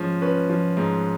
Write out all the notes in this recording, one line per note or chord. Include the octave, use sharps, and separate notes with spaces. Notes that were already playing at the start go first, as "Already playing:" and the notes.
Already playing: G#2 F3 G#3 C#4
C#4 B4
F3
G#2